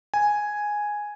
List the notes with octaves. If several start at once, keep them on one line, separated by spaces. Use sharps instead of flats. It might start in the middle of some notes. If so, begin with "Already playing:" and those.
G#5